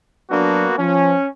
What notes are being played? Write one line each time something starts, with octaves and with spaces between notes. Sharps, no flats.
F#3 A#3 B3 D4 F#4
F3 C#4